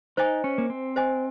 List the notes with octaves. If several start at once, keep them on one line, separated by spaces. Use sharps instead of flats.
D#4 C5 D#5 G#5
C#4
A#3
C4
C5 D#5 G#5